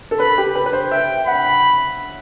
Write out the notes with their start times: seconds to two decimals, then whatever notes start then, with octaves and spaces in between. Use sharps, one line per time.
0.11 A4
0.20 B4 B5
0.38 G4
0.55 B4
0.66 B4
0.73 C5
0.92 E5 G5
1.27 F#5 B5